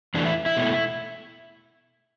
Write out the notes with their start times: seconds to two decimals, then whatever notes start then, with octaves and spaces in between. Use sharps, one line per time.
0.14 E2 E3 A3 D4
0.26 E4
0.46 E4
0.57 B2 A3